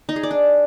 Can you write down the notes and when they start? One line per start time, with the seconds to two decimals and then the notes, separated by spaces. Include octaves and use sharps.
0.09 D#4
0.16 G#4
0.23 D5
0.31 D4